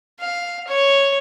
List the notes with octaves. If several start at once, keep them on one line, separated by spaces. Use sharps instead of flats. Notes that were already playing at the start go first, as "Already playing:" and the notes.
F5
C#5